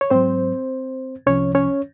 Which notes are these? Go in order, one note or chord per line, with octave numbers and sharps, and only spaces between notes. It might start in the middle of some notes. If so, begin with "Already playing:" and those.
C#5
G#2 F#3 C4 C5
C2 C3 F3 C#4 C#5
C#4 C#5